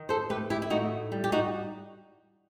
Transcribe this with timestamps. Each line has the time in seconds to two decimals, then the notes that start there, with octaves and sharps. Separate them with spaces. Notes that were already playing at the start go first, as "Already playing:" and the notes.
Already playing: D#3
0.09 A4 C5
0.29 A3 G4 B4
0.50 E4 G4
0.62 E4
0.70 A2 D#4 F#4
1.12 G3
1.24 G4
1.32 D#4 F#4